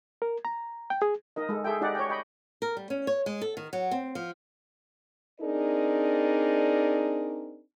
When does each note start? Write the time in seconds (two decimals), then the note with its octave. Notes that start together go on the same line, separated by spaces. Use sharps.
0.22 A#4
0.45 A#5
0.90 G5
1.02 G#4
1.36 D#4 A#4 D#5
1.49 G#3 A4
1.64 G#4 A4 E5 G5
1.81 D#4 G4 D5 F#5
1.95 C#5 G5
2.09 D#5 G5 B5
2.62 A#4
2.77 G3
2.90 C#4
3.07 C#5
3.26 G#3
3.41 A4
3.57 D#3
3.73 F#3
3.91 C4
4.15 F3
5.41 C4 D4 D#4 G#4 A#4 D5